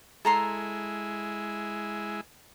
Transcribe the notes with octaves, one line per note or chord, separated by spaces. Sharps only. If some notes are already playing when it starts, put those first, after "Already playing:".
G#3 E4 A4 A#5 C6